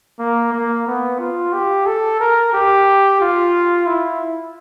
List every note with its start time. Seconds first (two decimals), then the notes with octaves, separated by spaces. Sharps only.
0.19 A#3
0.53 A#3
0.87 B3
1.19 F4
1.53 G4
1.86 A4
2.20 A#4
2.53 G4
3.21 F4
3.87 E4